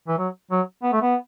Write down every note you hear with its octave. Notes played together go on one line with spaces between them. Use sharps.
E3
F#3
F#3
B3
A3
B3